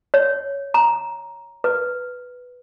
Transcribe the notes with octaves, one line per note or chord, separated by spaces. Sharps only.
C#5
A#5
B4